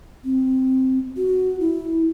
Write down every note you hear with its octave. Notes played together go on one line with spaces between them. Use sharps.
C4
F#4
E4